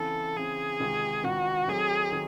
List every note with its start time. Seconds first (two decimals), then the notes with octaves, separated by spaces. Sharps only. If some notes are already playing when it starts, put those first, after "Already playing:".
Already playing: C#3 E3 C4 A4
0.36 C#3 E3 C4 G#4
0.80 C#2 C3 D#3
1.24 C#2 C3 D#3 F#4
1.68 D#3 F#3 A3 C4 G#4
2.12 D#3